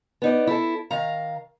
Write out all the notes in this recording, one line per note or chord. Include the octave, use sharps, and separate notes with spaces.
B3 D#4 D5
E4 A4
D#3 F5 A#5